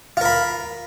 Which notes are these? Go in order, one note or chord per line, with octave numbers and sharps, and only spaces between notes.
F4 A#4 B5